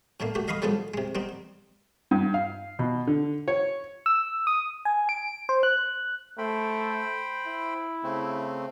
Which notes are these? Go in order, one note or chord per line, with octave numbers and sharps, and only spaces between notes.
A2 D3 A3 A#3
A3 F#4 G4
D#5 F5 B5 C#6 D#6
D3 F3 F#3 G#3 B3 A4
C3 G#3
G3 B3 C4 D#4
G2
F5
B2
D3
C#5
E6
D#6
G#5
D7
C5
F#6
A3 C5 G5 B5
E4
C#3 A3 C4